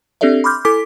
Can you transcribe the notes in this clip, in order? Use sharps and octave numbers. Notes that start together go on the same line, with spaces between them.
C4 D4 G4 A4 D5 E5
B5 C6 D6 F6 G6
E4 A4 G#5 D6 B6